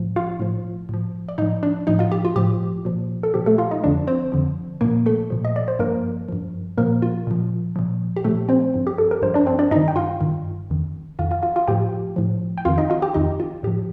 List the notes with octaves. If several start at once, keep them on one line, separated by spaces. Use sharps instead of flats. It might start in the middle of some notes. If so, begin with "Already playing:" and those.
Already playing: A2 F3
F4 F5
A2 F3
A2 F3
D5
A2 F3 D#4 D#5
D4 D5
A2 F3 D#4 D#5
F4 F5
G4
F4
A2 F3 G4
A#2 F3
A4
A#2 F3 G4
A3 A4
F4 F5
D#4 D#5
F2 D3 F3 D4 D5
C4 C5
F2 D3 F3
A#2 F3 A#3 A#4
A3 A4
A#2 F3
D#5
D5
C5
G2 F3 A#3 A#4
G2 F3
A#2 F3 A#3 A#4
F4
A#2 F3
A#2 F3
G4
A#2 F3 A3 A4
C4 C5
G2 F3
G4
A4
A#4
G2 F3 C5
D4 D5
C4 C5
D4 D5
G2 D#3 D#4 D#5
G5
F4 F5
G2 D#3
F2 D#3
F2 D#3 F4 F5
F4 F5
F4 F5
F4 F5
A2 F3 G4 G5
A2 F3
G5
F2 D#3 F4 F5
D#4 D#5
F4 F5
G4 G5
F2 D#3 D#4 D#5
F4
A2 F3 G4